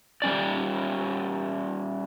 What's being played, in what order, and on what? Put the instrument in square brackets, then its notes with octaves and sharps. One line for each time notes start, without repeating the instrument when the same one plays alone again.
[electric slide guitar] G3 C#4 D5